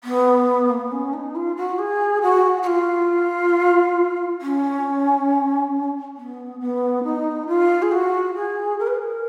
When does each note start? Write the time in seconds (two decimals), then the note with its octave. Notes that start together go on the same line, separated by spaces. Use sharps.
0.04 B3
0.69 A#3
0.80 B3
0.91 C#4
1.13 D#4
1.35 F4
1.56 F#4
1.78 G#4
2.22 F#4
2.62 F#4
2.66 F4
4.41 C#4
6.16 B3
6.60 B3
7.04 D#4
7.47 F4
7.82 G#4
7.91 F#4
8.35 G#4
8.79 A#4
8.87 B4
8.94 A#4